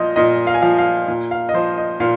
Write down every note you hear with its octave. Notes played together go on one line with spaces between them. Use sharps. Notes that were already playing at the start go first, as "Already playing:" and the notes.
Already playing: A#2 F3 F4 C5 D#5
A#2 D#5
F5
G#5
F3 F5
F5
A#2
F5
D#5
F3 C5
D#5
A#2 F5